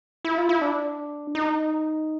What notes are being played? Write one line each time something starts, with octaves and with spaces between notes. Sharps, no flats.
E4
F4
E4
D4
D#4